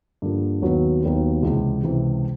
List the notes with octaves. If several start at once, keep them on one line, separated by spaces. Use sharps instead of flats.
G2 D3 F3 A#3
D#2 D#3 F#3 B3
D#2 D#3 F#3 B3
C#2 C3 E3
C#2 C3 E3